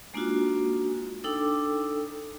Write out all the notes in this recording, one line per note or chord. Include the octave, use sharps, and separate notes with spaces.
G#3 A#3 D4 D#4 F4 F#4
D4 D#4 A4 G5 D6 E6